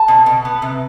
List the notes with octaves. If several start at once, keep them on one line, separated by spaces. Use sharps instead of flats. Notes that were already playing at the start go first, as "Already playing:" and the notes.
Already playing: A5
B2
B2
B3
C3